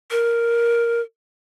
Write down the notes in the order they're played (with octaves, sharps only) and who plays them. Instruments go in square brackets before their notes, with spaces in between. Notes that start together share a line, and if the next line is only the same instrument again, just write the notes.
[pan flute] A#4